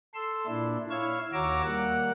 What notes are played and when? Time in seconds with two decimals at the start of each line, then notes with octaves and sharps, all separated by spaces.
0.14 A4 C6 E6
0.47 A#2 D4 E4
0.90 E4 C#5 F5 E6 G#6
1.33 D#2 F#4 C#5 A#5 D6 E6
1.64 G3 A#3 F#5